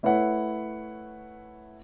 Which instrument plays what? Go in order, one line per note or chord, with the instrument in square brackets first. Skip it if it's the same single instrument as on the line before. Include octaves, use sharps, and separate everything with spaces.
[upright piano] A3 E4 B4 C#5 F#5